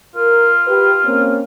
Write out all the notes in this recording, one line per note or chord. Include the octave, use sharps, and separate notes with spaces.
F4 A#4
G4 B4
A#3 C4 C#4